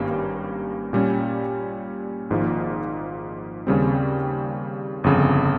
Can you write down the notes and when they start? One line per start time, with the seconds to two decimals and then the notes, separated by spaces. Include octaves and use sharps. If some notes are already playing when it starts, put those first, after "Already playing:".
Already playing: G#1 G2 G3 A#3 C#4
0.93 A#2 G3 C#4
2.30 G#1 G#2 F3 A#3 F4
3.67 D#2 C#3 G3 C4
5.04 G1 F2 C#3